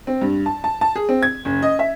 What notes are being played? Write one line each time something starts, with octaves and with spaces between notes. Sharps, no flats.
C4
G2
A5
A5
A5
G#4
C4
G#6
F#1
D#5
E5